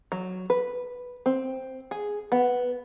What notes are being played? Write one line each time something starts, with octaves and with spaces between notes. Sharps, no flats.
F#3
B4
C4
G#4
B3